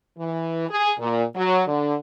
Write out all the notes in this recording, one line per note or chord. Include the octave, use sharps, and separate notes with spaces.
E3
G#4
A#2
F#3
D3